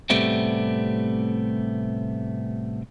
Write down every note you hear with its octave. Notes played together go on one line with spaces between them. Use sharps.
A2 C3 G3 A3 B3 C4